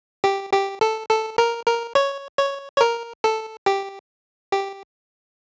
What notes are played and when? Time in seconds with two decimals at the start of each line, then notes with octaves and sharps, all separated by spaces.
0.24 G4
0.53 G4
0.81 A4
1.09 A4
1.38 A#4
1.66 A#4
1.95 C#5
2.38 C#5
2.76 C#5
2.81 A#4
3.24 A4
3.66 G4
4.52 G4